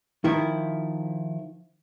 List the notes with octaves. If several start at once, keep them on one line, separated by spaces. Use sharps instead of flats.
D#3 F3 E4